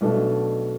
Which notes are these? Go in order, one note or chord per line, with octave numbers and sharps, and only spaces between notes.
B1 B2 A3 D4